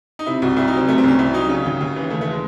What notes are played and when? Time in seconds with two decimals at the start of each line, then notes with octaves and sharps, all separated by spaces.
0.19 D#4
0.26 C3 E4
0.42 C2 F#4
0.57 C2 E4
0.68 D#4
0.73 F#3 C4
0.88 C3 A3
0.98 C4
1.04 C2 C#4
1.19 C2 E4
1.33 F#3 D#4
1.49 C#3 C#4
1.65 D#2
1.81 D#2
1.96 E3
2.10 C#3 A3
2.21 A3
2.31 G#3